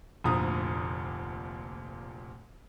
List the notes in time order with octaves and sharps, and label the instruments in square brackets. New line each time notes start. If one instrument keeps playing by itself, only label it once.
[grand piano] F1 D2 A#2 F3 A#5 D#6